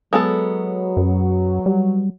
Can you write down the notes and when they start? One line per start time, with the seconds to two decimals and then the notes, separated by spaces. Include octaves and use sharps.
0.13 F#3 G#3 B3 A4
0.97 F#2
1.66 G3